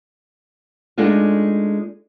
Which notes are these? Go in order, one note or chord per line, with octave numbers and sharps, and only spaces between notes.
G#3 A3 D4 D#4 F4